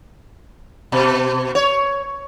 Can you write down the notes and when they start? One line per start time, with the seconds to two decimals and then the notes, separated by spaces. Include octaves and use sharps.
0.92 B2
1.55 C#5